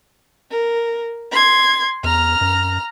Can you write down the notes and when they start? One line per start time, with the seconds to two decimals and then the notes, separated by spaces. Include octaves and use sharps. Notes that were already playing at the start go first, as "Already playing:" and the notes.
0.50 A#4
1.31 C6 G#6
2.04 E2 A#5 F6
2.41 F#2